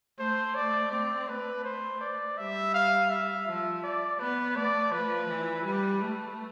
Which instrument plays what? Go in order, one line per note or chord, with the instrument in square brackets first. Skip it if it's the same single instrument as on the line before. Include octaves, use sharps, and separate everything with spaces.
[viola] A3 [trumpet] C5
[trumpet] D5
[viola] C4 [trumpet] D5
[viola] A3 [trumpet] B4
[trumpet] C5
D5
[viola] G3 [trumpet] E5
[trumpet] F5
E5
[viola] F3 [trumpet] E5
[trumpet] D5
[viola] B3 [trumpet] B4
[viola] A3 [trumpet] D5
[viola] F3 [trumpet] B4
[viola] E3
[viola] G3 [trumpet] B4
[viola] A3